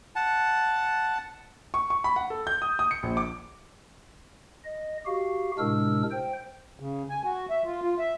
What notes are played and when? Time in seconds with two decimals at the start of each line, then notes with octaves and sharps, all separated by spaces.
0.16 F#5 A5
1.74 C#6
1.90 C#6
2.04 B5
2.16 F#5
2.30 A4
2.47 G6
2.62 D#6
2.79 D#6
2.91 C#7
3.03 A#1
3.17 D6
4.65 D#5
5.06 F#4 G4 F5
5.58 A2 C3 G#3 D4 A#4 E6
6.11 C5 G5
6.80 C#3
7.09 G#5
7.24 F#4
7.50 E5
7.65 F4
7.82 F4
7.99 E5